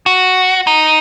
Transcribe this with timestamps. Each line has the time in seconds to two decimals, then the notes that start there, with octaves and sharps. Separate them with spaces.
0.06 F#4
0.67 D#4